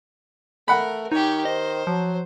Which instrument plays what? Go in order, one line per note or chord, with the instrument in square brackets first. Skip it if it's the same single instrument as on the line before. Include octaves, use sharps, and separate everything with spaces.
[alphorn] A3 [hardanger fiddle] A#4 [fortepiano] F#5 B5
[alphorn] D#3 [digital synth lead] D#4 [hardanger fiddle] G4 C#5
[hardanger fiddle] C5 [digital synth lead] D#5
[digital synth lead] F3 [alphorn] F#3